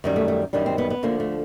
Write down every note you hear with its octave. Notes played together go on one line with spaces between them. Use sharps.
F#2 D#3 G3
A3
A3
F#2 D#3 G3 D4
C4
B3
B3
D2 D3 F3 A#3
A3